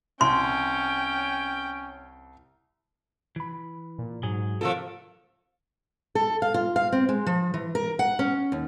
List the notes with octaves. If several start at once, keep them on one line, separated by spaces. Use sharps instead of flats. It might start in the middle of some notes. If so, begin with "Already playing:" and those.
C2 C#4 G5 C6
E3 B5
A#2
G#2 F#3 G#4
C3 F3 A3 A#3 F4 A4
A4
F5
F4
F5
C4
G#3
F3
E3
A#4
F#5
C#4
D#2